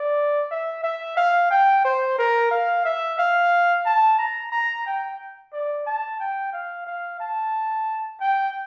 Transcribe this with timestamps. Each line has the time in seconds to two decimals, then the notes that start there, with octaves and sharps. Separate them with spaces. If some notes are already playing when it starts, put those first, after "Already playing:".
Already playing: D5
0.51 E5
0.83 E5
1.17 F5
1.50 G5
1.84 C5
2.18 A#4
2.51 F5
2.85 E5
3.18 F5
3.86 A5
4.18 A#5
4.52 A#5
4.86 G5
5.53 D5
5.86 A5
6.20 G5
6.53 F5
6.87 F5
7.20 A5
8.20 G5